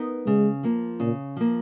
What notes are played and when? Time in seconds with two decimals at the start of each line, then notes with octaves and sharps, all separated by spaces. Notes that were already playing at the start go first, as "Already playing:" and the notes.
Already playing: B3 D#4 A#4
0.26 C#3 G#3
0.63 F3 A#3
1.00 A#2 C#3
1.36 F3 A#3